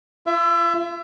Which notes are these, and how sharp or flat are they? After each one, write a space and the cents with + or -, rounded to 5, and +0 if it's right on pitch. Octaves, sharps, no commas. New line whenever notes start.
F4 -40 E5 +25